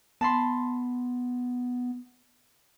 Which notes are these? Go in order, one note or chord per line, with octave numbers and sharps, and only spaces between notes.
B3 A5 B5 C6